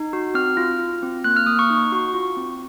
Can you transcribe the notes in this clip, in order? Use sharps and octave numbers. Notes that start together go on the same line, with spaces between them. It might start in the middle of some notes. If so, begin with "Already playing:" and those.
Already playing: D#4
F#4
C4 F6
F4
F4
C4
A#3 F#6
F6
A#3 D#6
C#6
D#4
F#4
F4
C4